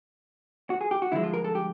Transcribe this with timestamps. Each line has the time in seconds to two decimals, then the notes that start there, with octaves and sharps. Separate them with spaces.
0.70 F#4
0.81 G#4
0.91 G4
1.02 F#4
1.12 G2 D3 F3 G#3 E4
1.24 F4
1.34 A#4
1.44 A4
1.55 G4